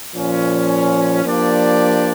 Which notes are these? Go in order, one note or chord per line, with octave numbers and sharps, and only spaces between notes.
A#2 F3 C#4
F3 A#3 D4 G4 D5